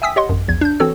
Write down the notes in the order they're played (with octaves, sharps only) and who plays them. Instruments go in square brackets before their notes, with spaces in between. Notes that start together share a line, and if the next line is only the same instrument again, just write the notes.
[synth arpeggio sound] E5 G5 G#5 D#6 E6 B6
G4 C#5 D#5 F#5 C6
A1 F#2
A#1 E2 G#6
D4 G6
E3 C4 F#4 A4 C#5 E6